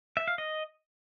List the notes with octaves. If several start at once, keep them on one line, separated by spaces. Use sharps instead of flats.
E5
F5
D#5